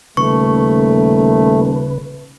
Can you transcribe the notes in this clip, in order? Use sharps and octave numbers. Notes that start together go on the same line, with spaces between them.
D#1 C#3 A3 B4 C#6